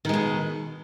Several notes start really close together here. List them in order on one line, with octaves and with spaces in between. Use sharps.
D#3 G#3 B2